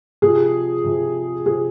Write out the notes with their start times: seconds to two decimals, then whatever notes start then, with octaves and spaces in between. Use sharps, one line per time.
0.22 C3 F3 G#4
0.84 C3 F3
1.46 C3 F3 G#4